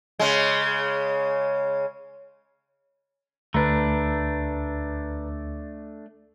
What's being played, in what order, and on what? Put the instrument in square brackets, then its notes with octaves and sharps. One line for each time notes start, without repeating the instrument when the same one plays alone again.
[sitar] C#3 G#3
[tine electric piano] D2 [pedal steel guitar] A3 D4 [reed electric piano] B4 A#5